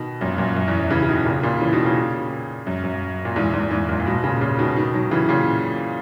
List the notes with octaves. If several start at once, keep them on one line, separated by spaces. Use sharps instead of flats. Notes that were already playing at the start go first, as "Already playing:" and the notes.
Already playing: B2 D#3
F#2 A#2
F#2 A#2
F#2
E2
F#2
C#3 E3
C#3
B2 D#3
A#2 C#3
A#2 C#3
C#3 E3
B2 D#3
A#2 C#3
F#2
F#2
A#2
E2 G#2
E2 G#2
E2 G#2
F#2 A#2
A#2
G#2 B2
A#2 C#3
A#2 C#3
B2 D#3
B2 D#3
D#3 F#3
C#3 E3
A#2 C#3